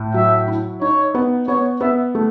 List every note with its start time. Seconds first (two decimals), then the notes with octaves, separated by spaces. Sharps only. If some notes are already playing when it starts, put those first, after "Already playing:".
Already playing: A2
0.14 F#3 E5
0.48 E4
0.81 D#4 C#5
1.14 B3
1.48 B3 C#5
1.81 B3 E5
2.15 A3